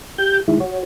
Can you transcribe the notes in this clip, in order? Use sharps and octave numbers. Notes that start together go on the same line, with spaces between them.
G4 G6
D#3 G#3 E4
F#4 C#5